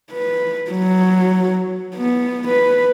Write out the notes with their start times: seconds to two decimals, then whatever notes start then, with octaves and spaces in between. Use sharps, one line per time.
0.11 B4
0.71 F#3
1.96 B3
2.48 B4